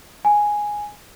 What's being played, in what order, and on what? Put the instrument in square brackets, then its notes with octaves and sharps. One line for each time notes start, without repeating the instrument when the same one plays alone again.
[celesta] G#5